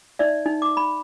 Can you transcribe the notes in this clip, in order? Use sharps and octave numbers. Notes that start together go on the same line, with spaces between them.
D#4 D5 E5
D#4
D6
B5